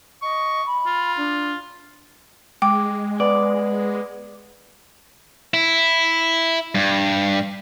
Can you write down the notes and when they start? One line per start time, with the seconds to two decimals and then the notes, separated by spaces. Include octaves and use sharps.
0.22 D#5 C#6
0.66 B5
0.86 F4
1.17 D4
2.62 G#3 G5 D6
3.20 B3 D5
5.54 E4
6.75 G2